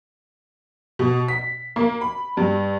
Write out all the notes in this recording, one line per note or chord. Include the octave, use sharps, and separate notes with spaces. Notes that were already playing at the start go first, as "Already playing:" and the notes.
B2
B6
A#3
B5
G2